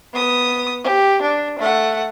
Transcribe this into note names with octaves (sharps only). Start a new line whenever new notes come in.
B3 D#6
G4
D4
A3 F#5